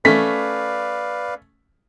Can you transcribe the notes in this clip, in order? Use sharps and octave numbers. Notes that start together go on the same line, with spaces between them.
A3 C#4 B4 D5 F5 B6